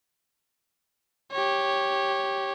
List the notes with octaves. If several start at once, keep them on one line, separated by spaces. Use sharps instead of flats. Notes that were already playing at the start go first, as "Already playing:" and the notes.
G4 C#5